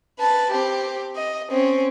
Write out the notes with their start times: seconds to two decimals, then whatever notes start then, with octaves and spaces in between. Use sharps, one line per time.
0.19 B4 A5
0.51 C4 G4
1.16 D#5
1.51 C4 C#4